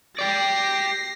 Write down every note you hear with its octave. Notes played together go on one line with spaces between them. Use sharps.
G4 D5 A#6 C7